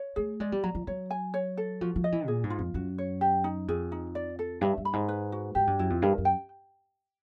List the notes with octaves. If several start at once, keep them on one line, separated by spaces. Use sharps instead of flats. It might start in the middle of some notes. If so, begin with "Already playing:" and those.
Already playing: C#5
A3 G#4
G#3 D5
G3
F#3 A#5
F3
F#3 C#5
G#5
C#5
A4
F3 F#4
F3
D#5
E3
A#2 G#4
G#2
F4
F2
F#2 F#4
C#5
G4
D#4
F2 G#4
D#4
D5
A4
G2 E5
G2
B5
G#2
B4
F#4
G#2 G4
G2
F#2 E4
F2
G2 A#4
F#2
G5